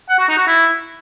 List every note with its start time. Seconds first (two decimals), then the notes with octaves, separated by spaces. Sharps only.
0.09 F#5
0.19 F#4
0.28 D#4
0.38 F#4
0.47 E4